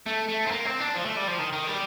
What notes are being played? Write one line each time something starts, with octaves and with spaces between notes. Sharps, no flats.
A3
A3
C4
A#3
C4
D4
F3
A3
G3
F3
D#3
D#3
G3